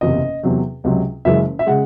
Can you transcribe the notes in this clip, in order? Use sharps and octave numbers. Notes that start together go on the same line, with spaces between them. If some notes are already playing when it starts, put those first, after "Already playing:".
F#1 E2 C3 D#5
E2 C3 F#3
C#2 C3 F#3
F#1 F#2 E3 G#3 E5
E5
C#3 G#3 F#5